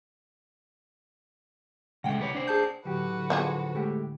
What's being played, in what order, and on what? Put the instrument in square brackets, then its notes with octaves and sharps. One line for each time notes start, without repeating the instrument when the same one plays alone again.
[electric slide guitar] C#3 G#3 A3 [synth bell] F#5 G5
[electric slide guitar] C3 B4 C#5
D4 C5
[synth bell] G#4 A5 G6
[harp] A2 D3 [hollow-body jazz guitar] F#3 G4 [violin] F#4 B4
[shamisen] F3 D4 G#4
[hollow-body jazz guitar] G#3 A3 G4